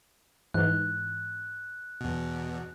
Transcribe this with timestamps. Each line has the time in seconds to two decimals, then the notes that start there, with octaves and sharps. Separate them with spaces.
0.54 G#2 E3 F#6
2.01 E2 B2